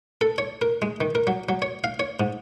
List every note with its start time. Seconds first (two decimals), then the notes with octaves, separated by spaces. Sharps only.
0.21 A4
0.38 C#5
0.62 A#4
0.82 G#3
1.01 D#3
1.15 A#4
1.27 F#3
1.49 F#3
1.62 C#5
1.84 F5
2.00 C#5
2.20 G#2